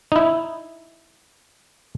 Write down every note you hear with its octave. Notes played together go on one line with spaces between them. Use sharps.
D#4 E4